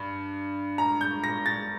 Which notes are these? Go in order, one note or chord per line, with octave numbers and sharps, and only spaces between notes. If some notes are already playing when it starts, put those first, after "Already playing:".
Already playing: G2
A#5
G6
A#6
A6